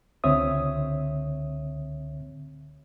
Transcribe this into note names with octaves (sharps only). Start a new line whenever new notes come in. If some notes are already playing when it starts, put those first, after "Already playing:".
C#2 D3 C4 C#5 E5 D#6